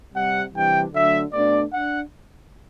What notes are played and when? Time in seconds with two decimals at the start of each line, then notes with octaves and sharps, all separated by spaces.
0.14 C3 G3 C4 F#5
0.54 C3 E3 G3 D4 G5
0.93 D3 F#3 A3 D4 E5
1.32 B2 A3 D4 D5
1.71 D4 F#5